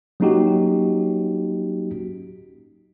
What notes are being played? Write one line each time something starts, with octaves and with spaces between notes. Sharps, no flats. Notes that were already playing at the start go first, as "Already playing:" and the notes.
F#3 A#3 C#4 D#4 F#4 G4